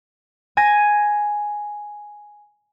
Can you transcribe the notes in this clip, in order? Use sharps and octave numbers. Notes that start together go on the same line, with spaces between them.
G#5 G#6 A#6 D#7